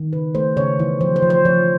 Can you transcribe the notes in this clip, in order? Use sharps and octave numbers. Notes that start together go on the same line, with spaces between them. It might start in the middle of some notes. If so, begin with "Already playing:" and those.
Already playing: D#3
C#3 B4
A3 C5
C#3 C#5
E3
F3 C5
C5
F3
C5
F3 C#5